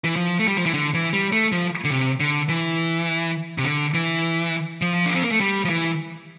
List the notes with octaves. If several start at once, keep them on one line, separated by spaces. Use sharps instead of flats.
E3
F3
A3
G3
F3
E3
D3
E3
G3
A3
F3
D3
C3
D3
E3
C3
D3
E3
F3
D4
C4
A#3
A3
G3
F3
E3